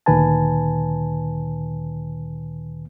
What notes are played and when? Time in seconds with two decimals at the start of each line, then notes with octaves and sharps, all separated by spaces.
0.06 D2 A#2 D#3 B4 G#5 A5